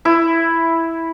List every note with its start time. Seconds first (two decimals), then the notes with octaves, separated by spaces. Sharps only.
0.05 E4